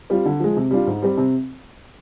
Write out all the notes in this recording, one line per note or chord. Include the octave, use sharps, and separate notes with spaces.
G3 C4 F4
D3
F3 G#3
C3
G3 D4 F4
G#2
G3 C4 G4
C3